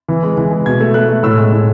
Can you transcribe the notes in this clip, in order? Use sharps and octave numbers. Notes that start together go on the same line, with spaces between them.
E3
G#3
E3
G#3
B2 G#6
A3
A3 F#6
A3
A2 E6
G#3
A2